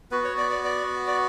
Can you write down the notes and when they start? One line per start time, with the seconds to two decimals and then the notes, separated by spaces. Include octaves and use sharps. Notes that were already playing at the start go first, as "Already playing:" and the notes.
0.11 B3 F#4 B4
0.25 C#5
0.38 D5
0.51 D5
0.64 D5
1.07 D5